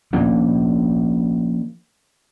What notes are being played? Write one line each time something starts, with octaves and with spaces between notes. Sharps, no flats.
F3 A#3 C#4 D4